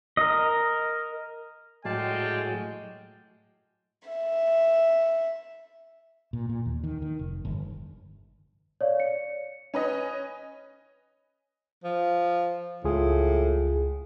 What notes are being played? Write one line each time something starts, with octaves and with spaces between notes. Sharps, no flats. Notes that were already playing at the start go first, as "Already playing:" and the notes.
A#4 D#5
A2 F#3 G#3 D5 F5 G5 A5
E5
A#2
A#2
D#2
D#3
D#3
F1
G1
C#5 D5 F5
C#7
C#4 B4 D#5
F3
C#2 A2 F4 G#4